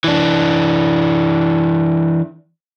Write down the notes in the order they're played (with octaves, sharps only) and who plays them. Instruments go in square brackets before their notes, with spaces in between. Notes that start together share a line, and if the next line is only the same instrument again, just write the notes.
[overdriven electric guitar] E3 D4